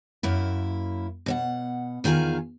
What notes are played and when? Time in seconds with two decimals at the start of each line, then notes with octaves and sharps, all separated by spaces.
0.23 F#2 A#3 E4
1.26 B2 C#5 F#5
2.04 E2 D#3 F4 G#4 G#5 A#5